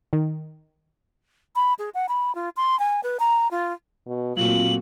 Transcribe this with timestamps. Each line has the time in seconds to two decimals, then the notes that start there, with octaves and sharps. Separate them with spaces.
0.13 D#3
1.56 B5
1.79 G#4
1.95 F#5
2.09 B5
2.35 F4
2.57 C6
2.79 G#5
3.03 B4
3.20 A#5
3.51 F4
4.07 B2
4.37 A#2 F#3 A3 C4 F4 F#4 F#7